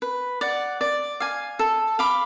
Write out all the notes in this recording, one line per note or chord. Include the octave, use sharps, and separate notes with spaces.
B4
D5 F#5
D5
F5 G#5
A4
F5 B5 D6